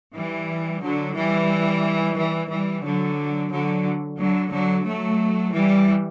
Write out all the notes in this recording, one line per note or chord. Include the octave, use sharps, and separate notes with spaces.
E3 G3
D3 F#3
E3 G3
E3 G3
E3 G3
D3 F#3
D3 F#3
D3 F#3
D3 F#3
F#3 A3
E3 G3